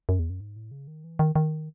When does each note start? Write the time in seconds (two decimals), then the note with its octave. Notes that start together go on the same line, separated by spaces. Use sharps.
0.09 F#2
0.19 E2
0.30 F#2
0.40 G#2
0.56 A2
0.71 C#3
0.87 D#3
1.04 E3
1.19 D#3
1.36 D#3